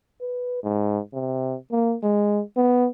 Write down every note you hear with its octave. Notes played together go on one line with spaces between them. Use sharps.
B4
G#2
C3
A#3
G#3
B3